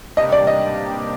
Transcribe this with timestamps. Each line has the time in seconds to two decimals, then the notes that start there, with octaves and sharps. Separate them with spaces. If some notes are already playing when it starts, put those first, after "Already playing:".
0.16 C3 G3 A#3 D4 G4 D#5
0.32 D5
0.47 D#5